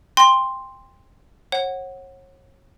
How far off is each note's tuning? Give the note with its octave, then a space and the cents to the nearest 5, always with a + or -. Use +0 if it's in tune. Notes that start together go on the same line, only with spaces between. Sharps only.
G5 +25 C6 +0
C#5 -35 F#5 +0